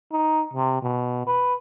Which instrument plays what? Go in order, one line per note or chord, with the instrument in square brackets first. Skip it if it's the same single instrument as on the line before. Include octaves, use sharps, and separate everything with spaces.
[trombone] D#4
C3
B2
B4